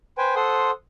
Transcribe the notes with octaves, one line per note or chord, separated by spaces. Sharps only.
B4 C5 G5 G#5
A4 C5 F#5 C6 D#6